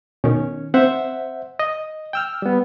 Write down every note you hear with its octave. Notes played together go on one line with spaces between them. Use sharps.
B2 D#3 C#4
C4 C5 E5 F#5
D#5
G5 E6 F6
G3 B3